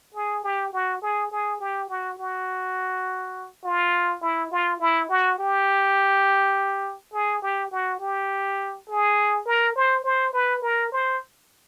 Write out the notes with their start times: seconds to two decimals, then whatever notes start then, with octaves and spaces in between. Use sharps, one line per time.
0.14 G#4
0.44 G4
0.73 F#4
1.02 G#4
1.31 G#4
1.60 G4
1.89 F#4
2.18 F#4
3.64 F4
4.22 E4
4.52 F4
4.80 E4
5.10 F#4
5.39 G4
7.13 G#4
7.42 G4
7.71 F#4
8.00 G4
8.88 G#4
9.46 A#4
9.76 C5
10.04 C5
10.33 B4
10.62 A#4
10.92 C5